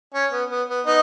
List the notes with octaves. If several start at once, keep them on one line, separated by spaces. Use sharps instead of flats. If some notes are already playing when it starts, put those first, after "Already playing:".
C#4
B3
B3
B3
B3 D#4